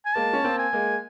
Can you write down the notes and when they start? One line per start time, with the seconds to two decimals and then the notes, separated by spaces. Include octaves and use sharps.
0.06 G#5
0.15 G#3 A#3 A5
0.33 C#4
0.44 A#3 C4
0.59 G#5
0.73 G#3 A#3